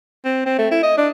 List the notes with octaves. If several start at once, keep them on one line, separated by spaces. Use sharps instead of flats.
C4
C4
A3
E4
D#5
D4